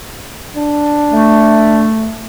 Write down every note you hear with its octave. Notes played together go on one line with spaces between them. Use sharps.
D4
A3